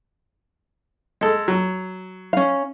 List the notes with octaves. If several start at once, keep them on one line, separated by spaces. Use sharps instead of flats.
G#3 A4
F#3
C#4 F5